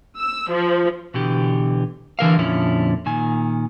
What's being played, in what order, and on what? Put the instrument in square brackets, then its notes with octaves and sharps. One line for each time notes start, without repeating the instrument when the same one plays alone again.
[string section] E6
F3
[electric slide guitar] B2 D3 E3 G4
D3 E3 A#4 F5
F2 A#2 D3 F3 C#4 E4
A#2 D#3 G#5